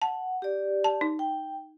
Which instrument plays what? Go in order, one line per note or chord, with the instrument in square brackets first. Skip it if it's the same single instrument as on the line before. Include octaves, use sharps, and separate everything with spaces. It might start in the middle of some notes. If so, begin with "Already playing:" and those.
[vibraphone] F#5 [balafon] A5
[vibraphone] G4 D5
[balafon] A5
D#4
[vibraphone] G5